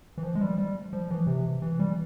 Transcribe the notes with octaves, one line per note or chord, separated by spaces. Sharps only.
E3
F3
G#3
G3
G3
F3
E3
C3
E3
G3